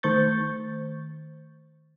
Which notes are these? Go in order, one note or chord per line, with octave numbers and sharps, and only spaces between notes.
D#3 A3 C5 C#6 G6 A6